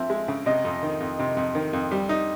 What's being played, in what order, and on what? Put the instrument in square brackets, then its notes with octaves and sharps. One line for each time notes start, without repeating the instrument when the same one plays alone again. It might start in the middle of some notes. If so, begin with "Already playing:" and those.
Already playing: [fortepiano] F3 C4 [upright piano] E5
[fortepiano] G#3
C#3
[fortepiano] C3 [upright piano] D#5
[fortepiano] F2
D#3
F2
C3
F2
D#3
F2
G3
D#4